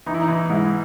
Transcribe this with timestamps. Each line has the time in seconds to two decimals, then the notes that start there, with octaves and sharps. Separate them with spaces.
0.06 E3 D#4
0.14 E4
0.21 D#4
0.28 E3
0.50 G#2 E4